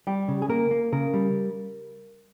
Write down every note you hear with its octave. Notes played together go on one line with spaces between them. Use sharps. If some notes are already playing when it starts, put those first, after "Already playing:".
G3 G4
C#3
G#4
A#3 A#4
A#3
C#3 A#4
G3